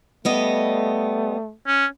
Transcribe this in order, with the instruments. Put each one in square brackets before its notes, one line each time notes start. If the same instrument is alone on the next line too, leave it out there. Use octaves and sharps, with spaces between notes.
[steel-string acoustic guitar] G3 B3 D#5 [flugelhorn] A3
[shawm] C#4